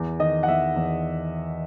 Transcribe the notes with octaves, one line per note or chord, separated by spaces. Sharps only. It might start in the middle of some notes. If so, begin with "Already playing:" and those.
Already playing: E2
D#3 D#5
F#5
E2 E5
E2